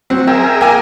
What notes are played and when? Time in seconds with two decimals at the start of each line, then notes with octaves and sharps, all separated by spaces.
0.10 F#3 C4
0.27 G#4 A#4 E5 G5
0.61 A#3 G5 G#5